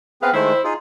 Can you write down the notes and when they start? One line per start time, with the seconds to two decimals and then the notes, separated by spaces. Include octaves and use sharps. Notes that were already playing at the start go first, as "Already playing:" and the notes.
0.22 B3 C4 G#4 B4 F5
0.34 D#3 G#3 A3 E4 C5
0.64 D#4 F4 G#4